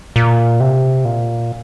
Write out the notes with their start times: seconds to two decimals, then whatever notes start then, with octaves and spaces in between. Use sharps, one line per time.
0.16 A#2
0.60 C3
1.05 A#2